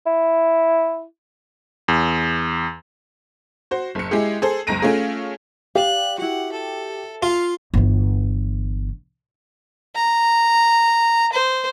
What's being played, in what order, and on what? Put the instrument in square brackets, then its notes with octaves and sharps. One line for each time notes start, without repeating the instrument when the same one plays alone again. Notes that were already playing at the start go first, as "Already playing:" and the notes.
[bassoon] E4
[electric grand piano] E2
[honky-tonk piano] F#4 C5
F#1 C#7
G#3 E4 G4 G#4
G#4 A4 C5
F#1 C#2 A#5 A#6 D7 D#7
A3 C#4 F4 G#4
[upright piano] G4 [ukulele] D5 F5 [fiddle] F#6
[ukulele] E4 F#4 [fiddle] F#5
[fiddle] A4
[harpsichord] F4 [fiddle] F5
[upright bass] G1 E3
[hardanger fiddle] A#5
C5